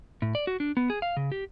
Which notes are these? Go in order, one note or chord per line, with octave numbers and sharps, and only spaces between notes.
A2
D5
F#4
D4
B3
G#4
F5
C#3
G4